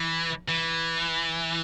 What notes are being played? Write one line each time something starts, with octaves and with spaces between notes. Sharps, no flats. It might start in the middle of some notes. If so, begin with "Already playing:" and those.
Already playing: E3
E3